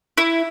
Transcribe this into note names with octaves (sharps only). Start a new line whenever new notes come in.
E4